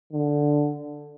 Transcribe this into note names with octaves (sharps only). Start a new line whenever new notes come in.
D3